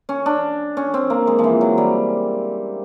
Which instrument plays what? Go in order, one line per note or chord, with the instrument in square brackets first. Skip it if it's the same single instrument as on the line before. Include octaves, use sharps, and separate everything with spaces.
[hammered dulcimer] C#4
D4
C#4
C4
A#3
G#3
F3
E3
F#3
G3